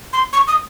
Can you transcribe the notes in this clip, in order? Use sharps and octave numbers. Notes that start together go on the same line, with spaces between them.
C6
C#6
D#6